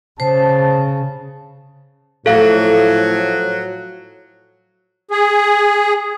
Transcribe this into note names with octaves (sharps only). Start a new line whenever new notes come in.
C#3 C5 A5
A2 F3 F#3 A4 F5
G#4